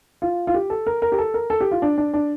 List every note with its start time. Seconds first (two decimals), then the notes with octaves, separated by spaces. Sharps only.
0.22 F4
0.47 F4
0.54 G4
0.70 A4
0.86 A#4
1.02 A#4
1.12 G4
1.18 A4
1.34 A#4
1.50 A4
1.61 G4
1.71 F4
1.82 D4
1.98 D4
2.14 D4